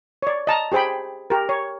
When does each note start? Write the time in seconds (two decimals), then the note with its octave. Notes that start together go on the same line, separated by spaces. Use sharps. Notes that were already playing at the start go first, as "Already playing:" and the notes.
0.22 C#5 D5
0.47 D#5 A5 A#5
0.72 G4 G#4 C5 G5 B5
1.30 G4 A#4
1.49 C#5